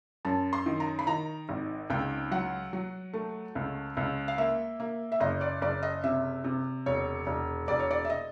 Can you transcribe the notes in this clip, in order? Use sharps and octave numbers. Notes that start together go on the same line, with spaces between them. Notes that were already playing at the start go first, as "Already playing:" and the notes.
F#2 A5
C6
D#3
A#5
B5
D#3 A#5
G#1
C#2 G5
F#3 F#5
F#3
A3
C#2
C#2
F5
A#3 E5
A#3
E5
F#1 D#5
D5
F#1 D5
D#5
C3 E5
C3
E1 C#5
E1
E1 D5
C#5
D5
E5
D#5